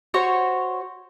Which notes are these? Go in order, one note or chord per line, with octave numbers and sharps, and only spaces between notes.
F#4 C5 C#5 C#6